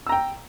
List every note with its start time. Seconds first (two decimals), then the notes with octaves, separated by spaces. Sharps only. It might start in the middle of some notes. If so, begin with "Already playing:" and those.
0.07 E6
0.09 A#5
0.12 G5